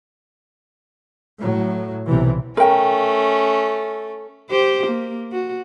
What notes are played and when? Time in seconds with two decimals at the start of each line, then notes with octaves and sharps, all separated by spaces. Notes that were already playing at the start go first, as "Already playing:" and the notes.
1.41 A2 F#3
2.06 B1 C3 E3
2.57 A3 C#4 A#4 G5
4.50 G4 C5
4.87 A#3
5.32 F#4